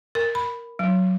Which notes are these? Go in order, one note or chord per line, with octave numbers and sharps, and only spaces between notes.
A#4
B5
F#3